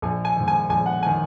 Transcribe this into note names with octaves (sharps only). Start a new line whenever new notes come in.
A#1 G#5
G#5
G#2 D#3
G#5
A#1 G#5
F#5
D#3 G#5